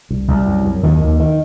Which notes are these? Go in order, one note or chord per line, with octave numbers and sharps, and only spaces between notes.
C2
C2
F#2
F#2
D#2 D#3
D#2
D#3